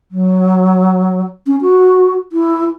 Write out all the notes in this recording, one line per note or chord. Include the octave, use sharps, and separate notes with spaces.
F#3
C#4
F#4
E4